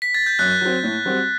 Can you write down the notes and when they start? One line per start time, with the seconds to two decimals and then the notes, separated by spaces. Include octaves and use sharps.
0.02 B6
0.14 A6
0.26 G6
0.39 F#2 F#6
0.61 F#3 C4
0.83 A2
1.05 G3 C4 F#4